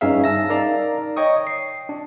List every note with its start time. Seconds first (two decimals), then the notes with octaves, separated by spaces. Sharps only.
0.01 G2 C#4 D#4 G#4 E5 F5
0.24 A5 E6 A#6
0.49 D#4 A#4 D5 F5 A#5
1.16 C#5 D#5 G5 C#6 D#6
1.47 C7
1.89 D4